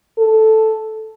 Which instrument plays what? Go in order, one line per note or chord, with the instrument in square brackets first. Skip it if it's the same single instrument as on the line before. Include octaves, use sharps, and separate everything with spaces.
[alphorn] A4